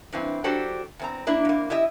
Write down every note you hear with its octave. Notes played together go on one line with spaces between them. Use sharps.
G2 E3 C4
F#3 D4 F#4 G4 A4 C5
E2 C4 A#5
A#3 D4 E4
F2 A#3
E4 G4 D#5 E5